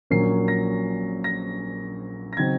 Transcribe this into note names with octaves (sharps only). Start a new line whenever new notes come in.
A#1 A#2 F#3 A#3 C#4 C7
A#6
A#6
A#6
C#3 F#3 C4 D#4 G#6